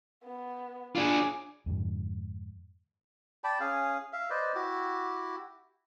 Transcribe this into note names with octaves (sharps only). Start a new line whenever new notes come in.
B3
D4 F4 G#4 D6
F2 G#2 D3
D5 G5 A5 B5
C#4 G#4 F5
E5 F5
B4 C5 D5 D#5
E4 F#4 G4